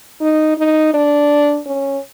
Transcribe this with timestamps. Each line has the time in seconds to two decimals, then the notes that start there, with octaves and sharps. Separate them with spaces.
0.21 D#4
0.57 D#4
0.94 D4
1.66 C#4